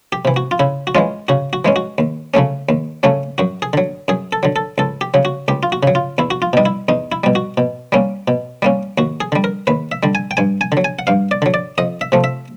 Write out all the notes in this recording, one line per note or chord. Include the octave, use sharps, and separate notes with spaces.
G4
C3 E3
F#4
F4
C#3 E4
F#4
E3 G#3 C#4 F4
C#3 F#4
F#4
E3 G#3 C#4
F#4
D#2
C#3 F#3 A3 C#4
D#2
C#3 F#3 A3 C#4
F#2 F#4
G#4
D3 F#3
F#2 G#4
A4
D3 F#3
A4
C#2 A4
G4
C#3 F#3
F#4
C#2 G4
F4
F#4
C#3 F#3
F4
E2 E4
F#4
F4
B2 G3 D#4
E4
E2 D#4
E4
B2 G3
F#4
B2
G3 A#3 C#4
B2
G3 A#3 C#4
D#2 F#4
G#4
D3 G3
A#4
D#2 B4
E5
D3 G3
G#5
G5
G2 G#5
G#5
D3
F#3
G#5
F#5
G2 F5
D5
D3 F#3
D5
F2 D#5
E5
C3 F3 A3
E5